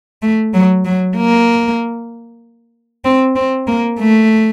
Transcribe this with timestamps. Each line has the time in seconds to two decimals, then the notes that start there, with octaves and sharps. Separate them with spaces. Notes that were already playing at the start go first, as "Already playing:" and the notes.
0.22 A3
0.54 F#3
0.85 F#3
1.16 A#3
3.05 C4
3.36 C4
3.67 A#3
4.00 A3